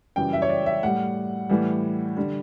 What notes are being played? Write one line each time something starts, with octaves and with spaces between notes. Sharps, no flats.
F#2 C#3 E3 G3 G5
E5
C#5
D5
E5
A2 G3 F#5
A2 E3 G3
D3 G3